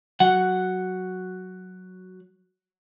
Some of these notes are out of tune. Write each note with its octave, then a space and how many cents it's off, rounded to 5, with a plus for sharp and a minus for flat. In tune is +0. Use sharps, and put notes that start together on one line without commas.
F#3 +0 F#5 +0